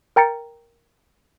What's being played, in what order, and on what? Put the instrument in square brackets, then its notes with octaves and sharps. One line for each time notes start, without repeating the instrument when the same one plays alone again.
[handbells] A#4 G5 A#5 A6 C#7